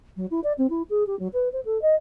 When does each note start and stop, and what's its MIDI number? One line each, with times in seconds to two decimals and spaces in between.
0.16 0.26 54
0.31 0.40 64
0.43 0.52 74
0.58 0.67 60
0.69 0.82 64
0.89 1.03 68
1.06 1.17 67
1.19 1.27 54
1.33 1.48 71
1.52 1.60 72
1.65 1.80 69
1.81 1.95 75